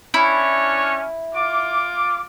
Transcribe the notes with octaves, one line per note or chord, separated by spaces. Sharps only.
C#4 D4 E4 C#5
F4 D6